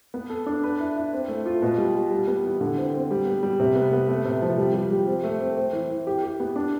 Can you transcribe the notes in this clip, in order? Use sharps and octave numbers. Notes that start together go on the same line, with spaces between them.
B3
A4
D4
B4
E4
E4
C4
A3
F4
B2
G3
G3
G3
B3
E3
D3
C4
C4
G3
B3
G3
C3
B3
B3
A3
C3
F3
G3
G3
G3
C4
A3
C4
C4
E3
E3
G4
G4
B3
D4